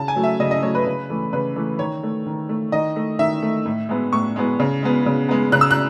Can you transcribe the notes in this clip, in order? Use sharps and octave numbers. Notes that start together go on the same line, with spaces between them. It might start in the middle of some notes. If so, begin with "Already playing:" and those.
Already playing: C#3 A5
G#5
F#3 A3
E5
C#3 D#5
D#5
F#3 A3 C#5
B4
C#3
E3 A3
C#3 B4
E3 A3
D#3 C#5
A3
D#3
A3
D#3 D#5
A3
D#3 E5
A3
A2
G#3 B3
A2 C#6
G#3 B3
C#3
G#3 B3
C#3
G#3 B3
C#3 F#6
E6
F#6